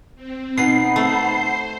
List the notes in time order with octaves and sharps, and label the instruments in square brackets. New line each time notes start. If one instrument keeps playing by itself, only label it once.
[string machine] C4
[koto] B2 [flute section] D#4 F#5 B5 [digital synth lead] C7
[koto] A3 [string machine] C5